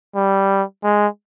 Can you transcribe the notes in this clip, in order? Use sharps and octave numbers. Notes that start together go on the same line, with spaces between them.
G3
G#3